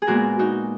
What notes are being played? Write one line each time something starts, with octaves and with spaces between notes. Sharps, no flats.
G#4
A#2 G#3 B3 F#4 A#4
D#4 F#4